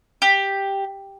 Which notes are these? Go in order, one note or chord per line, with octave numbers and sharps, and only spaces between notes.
G4